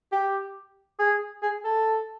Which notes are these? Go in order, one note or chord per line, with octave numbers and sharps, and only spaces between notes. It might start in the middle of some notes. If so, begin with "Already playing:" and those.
G4
G#4
G#4
A4